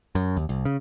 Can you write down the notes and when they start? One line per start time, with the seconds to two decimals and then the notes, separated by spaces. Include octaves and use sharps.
0.15 F#2
0.37 D#2
0.49 C2
0.65 C#3